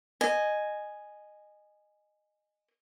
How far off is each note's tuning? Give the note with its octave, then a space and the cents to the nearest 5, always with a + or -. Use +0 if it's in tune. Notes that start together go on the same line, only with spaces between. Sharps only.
D#5 -15 G#5 +0